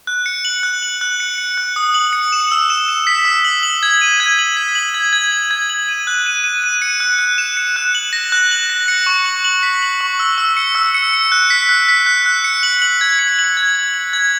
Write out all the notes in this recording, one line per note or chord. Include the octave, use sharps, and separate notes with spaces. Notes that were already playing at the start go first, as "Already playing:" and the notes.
F#6
C#7
F#7
F#6
F#7
F#6
C#7
C#7
F#6
D#6
F#7
C#7
E7
E6
E7
E7
B6
E6
F#7
F#7
G#6
D#7
G#6
F#7
B6
F#7
G#6
G#6
F#7
G#6
F#7
D#7
F#6
D#7
D#7
D#7
C#7
F#6
F#6
E7
C#7
F#6
F#7
A#6
F#6
F#7
A#6
C#7
C#6
F#7
F#7
B6
F#7
C#6
E6
E6
C#7
E6
C#7
C#7
F#6
B6
F#6
B6
F#6
F#6
C#7
F#7
F#7
G#6
C#7
F#7
G#6
G#6
F#7
G#6